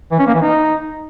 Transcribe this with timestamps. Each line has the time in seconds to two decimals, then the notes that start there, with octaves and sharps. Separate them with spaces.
0.12 E3
0.19 C#4
0.27 A#3
0.34 E3
0.42 D#4